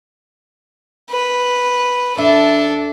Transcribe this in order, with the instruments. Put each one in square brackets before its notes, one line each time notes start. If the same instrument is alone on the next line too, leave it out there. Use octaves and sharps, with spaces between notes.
[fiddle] B4
[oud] E2 E5 [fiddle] D4 A4